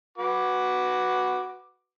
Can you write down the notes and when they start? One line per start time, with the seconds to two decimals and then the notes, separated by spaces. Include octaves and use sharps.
0.18 F#4 B4 D6